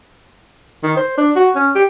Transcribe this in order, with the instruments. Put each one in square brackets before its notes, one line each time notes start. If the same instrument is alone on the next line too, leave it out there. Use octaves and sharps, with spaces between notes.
[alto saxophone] D#3
C5
D4
F#4
C#4
G4